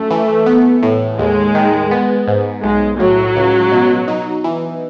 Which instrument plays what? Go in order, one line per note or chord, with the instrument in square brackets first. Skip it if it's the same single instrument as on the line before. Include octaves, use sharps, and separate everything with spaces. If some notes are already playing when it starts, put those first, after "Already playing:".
Already playing: [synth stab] F#2 [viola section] A3
[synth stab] E3
B3
A2
[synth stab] D#2 [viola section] G#3
[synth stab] D#3
B3
G#2
[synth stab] B1 [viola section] G#3
[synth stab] A2 [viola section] F#3
[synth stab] C#2
B2
D#4
E3